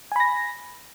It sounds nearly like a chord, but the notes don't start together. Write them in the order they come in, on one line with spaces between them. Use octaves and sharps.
G#5 B5 A#6